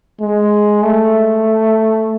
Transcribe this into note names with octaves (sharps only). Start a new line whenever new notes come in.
G#3
A3